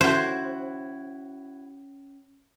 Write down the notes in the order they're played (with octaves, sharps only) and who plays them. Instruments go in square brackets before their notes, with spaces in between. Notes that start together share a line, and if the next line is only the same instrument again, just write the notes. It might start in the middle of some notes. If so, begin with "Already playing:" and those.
[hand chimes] C#4 [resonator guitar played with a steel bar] E4 F#4 [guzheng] C5